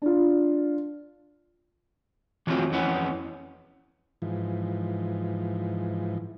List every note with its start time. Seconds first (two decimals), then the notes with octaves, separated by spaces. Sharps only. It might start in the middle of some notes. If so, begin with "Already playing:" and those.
0.02 D4 F4
2.47 E3 F#3 A3 C4 F4
2.71 F2 E3 B3 C#4
4.22 G#2 E3 F3